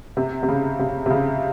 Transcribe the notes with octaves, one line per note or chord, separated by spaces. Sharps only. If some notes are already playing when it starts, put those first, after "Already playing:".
C3
C3
C#3
C3
C3
C#3